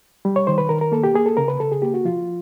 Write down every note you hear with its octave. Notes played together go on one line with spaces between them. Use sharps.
G3
C#5
D#3 C5
B4
D#3 A#4
A#4
A#3 A4
G4
A#3 G#4
A4
C#3 A#4
B4
C#3 A4
G#4
A#3 G4
F#4
F3 F4